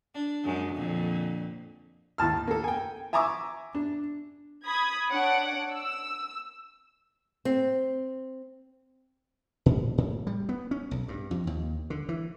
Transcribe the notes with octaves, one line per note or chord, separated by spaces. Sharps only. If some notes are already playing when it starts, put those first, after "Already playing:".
D4
F#2 G#3
F2 A#2 D3
D#2 A2 A5 F6
A#3 A4
G5 G#5
E5 G#5 A#5 C#6 D6 E6
D4
B5 D#6 G#6
D4 C#5 F#5 D7
E6
C4
A#2
A2
G3
B3
C#4
B1
G2
F2
D#2
D3
E3